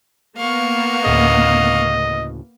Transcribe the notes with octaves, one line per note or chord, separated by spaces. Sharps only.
A#3 B3 F5 C#6
D2 A2 C#3 D#5